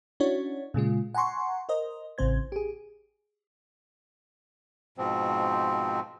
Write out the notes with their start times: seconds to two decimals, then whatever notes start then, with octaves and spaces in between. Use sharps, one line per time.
0.20 C#4 D4 E4 F#4 C#5
0.74 A#2 C#3 G#3 F4
1.15 F#5 G#5 A#5 C6 C#6
1.69 A#4 C5 D#5
2.18 A1 C#3 C4 C5 G#6
2.52 G4 G#4
4.98 G#2 B2 F3 C4